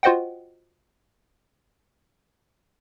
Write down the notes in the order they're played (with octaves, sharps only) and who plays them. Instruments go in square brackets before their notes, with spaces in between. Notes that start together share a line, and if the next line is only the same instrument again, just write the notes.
[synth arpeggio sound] F4 F#4 C5 D#5 F#5 G5